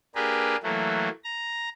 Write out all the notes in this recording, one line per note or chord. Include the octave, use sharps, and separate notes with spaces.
A#3 D4 G4 G#4 A#4 B4
E3 F#3 A3 A#3
A#5